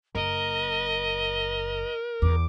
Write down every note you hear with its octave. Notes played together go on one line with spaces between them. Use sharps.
F#1 A#4 D#5
E2 E3 D6